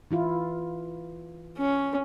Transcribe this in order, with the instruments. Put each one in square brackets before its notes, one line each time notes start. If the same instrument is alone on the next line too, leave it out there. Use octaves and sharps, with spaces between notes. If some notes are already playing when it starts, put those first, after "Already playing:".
[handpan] E3 E4 F4
[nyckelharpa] C#4